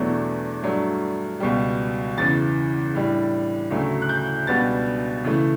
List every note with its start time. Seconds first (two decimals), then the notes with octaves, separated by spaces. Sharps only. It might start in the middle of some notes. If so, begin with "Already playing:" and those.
Already playing: E2 B2 F#3 A3 D4
0.63 G2 F#3 A3 D4
1.40 C#2 B2 G3
2.17 E2 C#3 E3 A6
2.95 A2 G3 D4
3.71 D2 C#3 F#3 A3
4.02 F#6
4.09 G6
4.47 C#2 B2 G3 B3 D4 A6
5.24 C#3 E3 A3